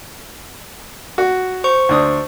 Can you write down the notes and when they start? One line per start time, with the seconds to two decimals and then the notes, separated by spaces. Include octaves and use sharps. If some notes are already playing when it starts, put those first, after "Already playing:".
1.18 F#4
1.64 C5 C#6
1.89 D2 D4 D#6